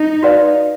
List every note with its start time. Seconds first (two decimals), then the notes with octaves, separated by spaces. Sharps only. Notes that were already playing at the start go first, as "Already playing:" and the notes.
Already playing: D#4
0.23 F#4 B4 D5 F5